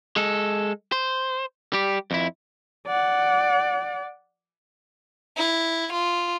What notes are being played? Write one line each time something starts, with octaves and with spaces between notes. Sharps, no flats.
G#3 A4
C5
G3 G4
F2 E4
D5 F#5
E4
F4